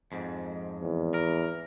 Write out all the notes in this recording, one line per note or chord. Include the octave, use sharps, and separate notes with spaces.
F2 G#2
E2
A#4